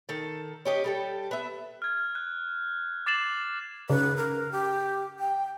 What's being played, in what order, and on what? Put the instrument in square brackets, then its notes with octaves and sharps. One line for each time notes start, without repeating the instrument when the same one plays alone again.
[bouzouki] D#3 A4
C#4 G4 D#5
G3 A4 G5
B3 E5
[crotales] F6 G#6
F#6
D6 A6 C7 E7 F#7
[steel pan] C#3 [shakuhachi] B4
[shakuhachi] A#4
G4
G5